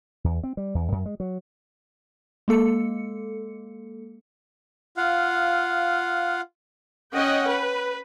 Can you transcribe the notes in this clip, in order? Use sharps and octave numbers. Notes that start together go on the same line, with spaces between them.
E2
C4
G3
E2
F#2
G#3
F#3
G#3 A#3 A4 C#7
F4 F5 F#5
C#4 D#5 F#5 G5
B4